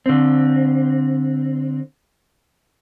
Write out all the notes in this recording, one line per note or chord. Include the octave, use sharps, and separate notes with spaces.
D3 C4